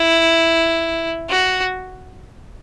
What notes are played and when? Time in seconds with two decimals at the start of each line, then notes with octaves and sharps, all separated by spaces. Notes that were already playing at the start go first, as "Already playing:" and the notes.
Already playing: E4
1.30 F#4